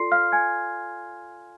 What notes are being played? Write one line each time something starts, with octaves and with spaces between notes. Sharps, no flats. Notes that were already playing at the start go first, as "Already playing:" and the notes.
Already playing: F4 A4 D5 C6 C7
F5 F6
G#5 G#6